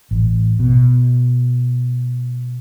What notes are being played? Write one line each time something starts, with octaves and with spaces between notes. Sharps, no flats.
A1
B2